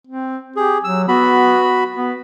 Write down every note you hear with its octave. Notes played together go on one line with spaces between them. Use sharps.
C4
G4 G#4
F#3 E6
B3 F#4 B5
B3